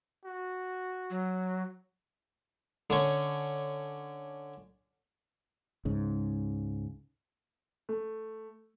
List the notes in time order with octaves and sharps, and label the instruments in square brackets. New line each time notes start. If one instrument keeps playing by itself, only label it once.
[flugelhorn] F#4
[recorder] F#3
[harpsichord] D3 C#4
[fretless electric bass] C#2 G#2 C#3
[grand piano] A3